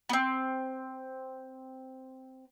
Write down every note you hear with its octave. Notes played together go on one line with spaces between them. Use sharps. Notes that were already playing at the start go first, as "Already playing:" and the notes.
B3 C4